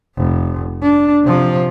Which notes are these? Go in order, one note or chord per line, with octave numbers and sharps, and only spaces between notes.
F1
D4
C3 F3